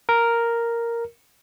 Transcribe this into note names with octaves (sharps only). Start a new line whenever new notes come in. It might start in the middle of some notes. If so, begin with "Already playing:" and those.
A#4